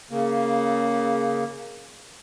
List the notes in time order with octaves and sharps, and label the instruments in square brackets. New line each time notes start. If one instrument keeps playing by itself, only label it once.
[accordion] C#3 A#3